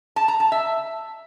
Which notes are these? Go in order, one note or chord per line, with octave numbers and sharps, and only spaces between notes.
A5
A#5
A5
E5